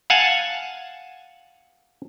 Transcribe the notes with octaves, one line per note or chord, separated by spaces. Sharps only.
F5 F#5 G#5 A5